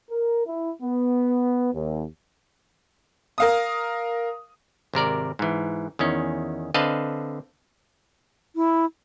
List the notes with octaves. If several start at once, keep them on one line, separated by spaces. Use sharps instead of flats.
A#4
E4
B3
D#2
A#4 F5 D#6
G#1 C3 A#4 D5
G#2 E3
E2 D#3 C#4
D3 C4 B4 D#5 F5 A5
E4